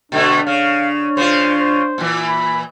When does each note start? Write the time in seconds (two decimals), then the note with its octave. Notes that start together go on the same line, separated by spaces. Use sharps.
0.12 B2 D3 A3 D4
0.47 C#3 F5
1.17 C#3 F4 C5
1.60 C5
1.98 A#2 E3
2.28 B5